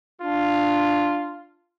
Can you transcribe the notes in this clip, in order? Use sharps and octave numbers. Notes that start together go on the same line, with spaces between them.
D4 F4